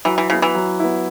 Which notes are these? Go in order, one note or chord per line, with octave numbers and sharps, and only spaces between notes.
E3 F#3
E3
C#3 B3 E4
E3
F#3
B3 E4